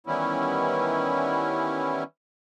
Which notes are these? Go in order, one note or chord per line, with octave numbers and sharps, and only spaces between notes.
D#3 E3 G3 B3 C#4 E4